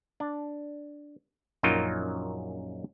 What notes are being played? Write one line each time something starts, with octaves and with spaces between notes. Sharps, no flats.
D4
A#1 F#2 F#3 D#4 F4 A#4